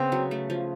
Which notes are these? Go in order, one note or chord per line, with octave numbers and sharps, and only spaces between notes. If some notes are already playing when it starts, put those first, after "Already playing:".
Already playing: C#3 B3 C4
F#3
A3
F3